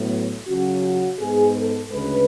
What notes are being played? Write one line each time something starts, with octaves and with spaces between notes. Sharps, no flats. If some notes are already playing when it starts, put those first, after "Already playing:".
Already playing: A2 F#3 B3
C#3 F#3 C#4 F#4
F#4
G#2 G#3 B3 G#4
A4
D2 C#3 G#3 B4